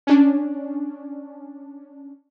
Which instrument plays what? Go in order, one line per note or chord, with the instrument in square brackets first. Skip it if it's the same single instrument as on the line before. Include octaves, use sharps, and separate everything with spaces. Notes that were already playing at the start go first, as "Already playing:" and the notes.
[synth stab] C#4 D4